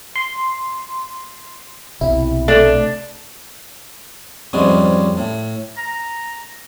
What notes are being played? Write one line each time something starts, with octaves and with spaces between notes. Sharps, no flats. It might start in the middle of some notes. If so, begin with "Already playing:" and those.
C6
B1 C3 E4
A3 D4
F2 G#2 G3 G#3 C#4
A2
A#5